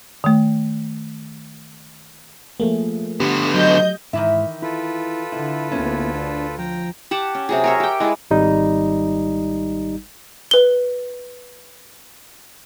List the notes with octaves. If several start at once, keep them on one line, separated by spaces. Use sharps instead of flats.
D#3 A3
F3 A3 A#3 G#4
D3 B3 G4
F#3 D#5 G6
G#2 D#3 E3 E4 E5
E4 F4 A4 B4
D3 E4
D2 A#3 B3 C#4 E4
D4
F3 G5 A#5
G4 F#5 A5
C#4
C3 F#3 G#4
A#4 C#5 E5
G4 G5
G#3 E4 B4 D5
G#1 G3 D#4
B4 G7